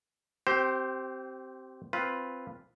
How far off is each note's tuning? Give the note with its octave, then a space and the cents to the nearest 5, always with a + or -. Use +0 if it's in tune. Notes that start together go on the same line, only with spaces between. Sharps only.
C4 +0 G4 -25 C5 +0
C4 +0 F4 +0 B4 +0